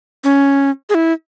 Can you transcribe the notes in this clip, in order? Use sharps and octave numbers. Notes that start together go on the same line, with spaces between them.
C#4
G#4
E4